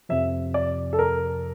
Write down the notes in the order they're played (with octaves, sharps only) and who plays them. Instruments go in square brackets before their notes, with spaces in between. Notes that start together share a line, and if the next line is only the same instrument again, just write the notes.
[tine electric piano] F2 C3 F3 [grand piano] E5
[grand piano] D5
A4
A#4